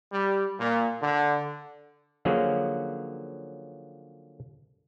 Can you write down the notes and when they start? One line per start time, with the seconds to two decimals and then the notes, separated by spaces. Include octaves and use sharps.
0.12 G3
0.60 A#2
1.02 D3
2.25 D3 F3 F#3 A#3 C#4 G#4